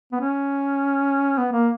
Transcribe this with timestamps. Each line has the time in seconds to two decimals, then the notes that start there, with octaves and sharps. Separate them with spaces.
0.12 B3
0.21 C#4
1.38 B3
1.53 A#3